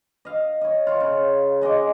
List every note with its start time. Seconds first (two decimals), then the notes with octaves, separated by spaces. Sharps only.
0.25 D#5 F5
0.61 C#5 D#5
0.87 F4 C#6
1.00 C#3
1.61 G#3 D#5 C#6 D6